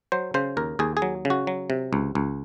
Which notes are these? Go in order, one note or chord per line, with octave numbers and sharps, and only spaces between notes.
F#3 C5
C#3 C5
D#2 A#4
D#2 G#4
G#4
F#3
C#3
F#4
F#3
C3
C#2
C#2